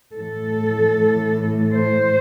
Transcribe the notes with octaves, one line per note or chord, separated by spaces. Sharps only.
A2 E3 A4
C5